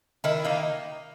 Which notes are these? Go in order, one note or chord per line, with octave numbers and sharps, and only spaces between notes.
D#3 E4
A#3 D#4